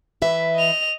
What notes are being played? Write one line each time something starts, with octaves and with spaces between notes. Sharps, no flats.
E3 B4 E5
D#5 F7